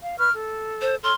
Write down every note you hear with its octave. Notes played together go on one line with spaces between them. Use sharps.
F5
B4 C#6 F6
A4
C5
A4 C#5 C6 F6